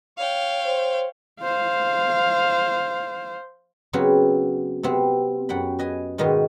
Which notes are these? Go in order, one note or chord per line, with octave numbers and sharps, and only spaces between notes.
C#5 F5 G5
C5
C5 F5
C#3 F#3 B3 C4
C3 B3 C4
F#2 F#5 G5 B5
B4 D#5 G#5
G#2 B2 D#3 B3 D#5 C6